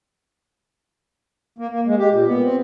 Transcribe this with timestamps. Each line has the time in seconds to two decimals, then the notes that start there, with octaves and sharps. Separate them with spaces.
1.58 A#3
1.70 A#3
1.86 G#3
1.98 G4
2.11 A#2
2.26 B3
2.42 C4